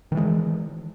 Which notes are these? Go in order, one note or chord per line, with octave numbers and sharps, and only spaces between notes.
D#3 E3 G#3